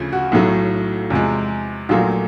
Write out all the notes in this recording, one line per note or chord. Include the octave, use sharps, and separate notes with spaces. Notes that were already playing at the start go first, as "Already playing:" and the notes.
Already playing: D2 C#3 F3
F#4
B1 A2 F#3 A3
E2 C3 F3 G#3
A#1 A#2 F#3 A3 F4